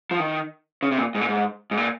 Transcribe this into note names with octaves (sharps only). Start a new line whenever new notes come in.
F3
D#3
C#3
C3
A#2
G#2
A#2
G#2
G#2
A#2